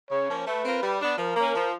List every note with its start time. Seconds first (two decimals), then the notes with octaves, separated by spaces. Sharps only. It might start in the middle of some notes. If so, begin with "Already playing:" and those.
0.11 C#3 C#5
0.29 F3 A#3 C#4
0.47 A3 B4
0.65 C4 F4 A#4
0.83 G3
1.01 B3 D4
1.18 F3 A#4
1.36 A#3 C#4
1.55 F3